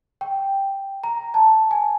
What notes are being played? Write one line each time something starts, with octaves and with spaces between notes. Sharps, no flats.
G5
A#5
A5
G#5